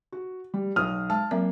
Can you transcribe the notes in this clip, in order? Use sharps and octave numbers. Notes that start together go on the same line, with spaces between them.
F#4
G3
B1 D#6 F6
G#3 A5
F#3 A#3 C4 E5